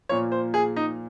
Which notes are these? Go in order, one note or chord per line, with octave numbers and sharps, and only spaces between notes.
A#2 F3 A#3 C#5
C5
G#4
D#4